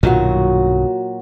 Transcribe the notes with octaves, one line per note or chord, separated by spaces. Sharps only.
B1 G2 A#2 D#3 F#3 F#4